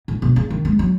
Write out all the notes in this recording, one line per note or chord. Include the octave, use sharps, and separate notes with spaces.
A2
B2
C#3
D#3
G#3
F#3